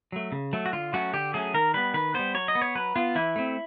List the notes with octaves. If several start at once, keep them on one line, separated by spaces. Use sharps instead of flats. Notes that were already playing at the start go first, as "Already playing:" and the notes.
F#3 A3
C#3
F#3 A3
F#4
D3 F4
F#3 A3 C#4 F#4
D3 G4
F#3 A3 C#4 G#4
D#3 A#4
G3 B3 B4
D#3 B4
G3 B3 C5
F#3 C#5
D#5
B3
C#5
F#3 B4
B3 F4
E3 E4
A3 C4